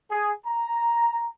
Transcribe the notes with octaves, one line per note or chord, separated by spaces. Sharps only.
G#4
A#5